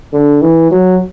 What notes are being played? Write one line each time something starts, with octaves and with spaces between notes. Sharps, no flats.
D3
E3
F#3